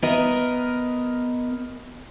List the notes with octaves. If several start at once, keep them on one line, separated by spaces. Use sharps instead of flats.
B3 A#4 D#5